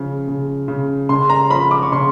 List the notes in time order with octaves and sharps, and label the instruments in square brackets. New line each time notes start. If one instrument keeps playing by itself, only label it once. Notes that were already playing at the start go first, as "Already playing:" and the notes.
Already playing: [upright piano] C#3 F3
C#3
C#3
C#3 C6
A#5
F3 B5
D6
C#6
C#3 C6